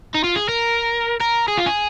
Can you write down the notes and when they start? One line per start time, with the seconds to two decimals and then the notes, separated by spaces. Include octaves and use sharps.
0.15 D#4
0.24 F4
0.36 G#4
0.49 A#4
1.20 A#4
1.48 G#4
1.57 F4
1.66 G#4